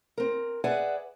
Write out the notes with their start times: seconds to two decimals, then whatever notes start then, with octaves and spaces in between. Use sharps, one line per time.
0.18 C4 A#4
0.64 G#4 B4 D5 E5 F#5 G#5